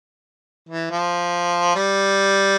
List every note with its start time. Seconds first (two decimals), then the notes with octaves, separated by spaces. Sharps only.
0.69 E3
0.91 F3
1.75 G3